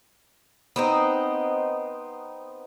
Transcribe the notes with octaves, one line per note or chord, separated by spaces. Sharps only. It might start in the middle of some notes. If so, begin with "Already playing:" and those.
B3 C4 D#4